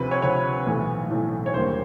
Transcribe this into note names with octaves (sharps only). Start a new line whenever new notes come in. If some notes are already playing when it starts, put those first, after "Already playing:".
Already playing: D2 C3 F3 B4
C#5
D2 C3 F3 C#5
B1 A2 E3 A3
B1 A2 E3 A3
C#5
D#2 D3 G3 A#3 C5